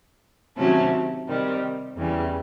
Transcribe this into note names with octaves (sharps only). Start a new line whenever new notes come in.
C3 D#3 F#3 A3 C#4
C3 D#3 G3
E2 C#3 E3 G3